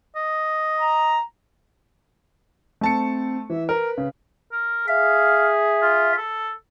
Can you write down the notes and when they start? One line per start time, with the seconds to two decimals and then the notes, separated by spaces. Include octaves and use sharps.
0.16 D#5
0.80 A#5
2.81 A3 C4 A5 C#7
3.50 E3 E5
3.69 A#4 B4
3.98 C#3
4.52 A#4
4.88 G#4 E5 F5
5.82 F4
6.18 A4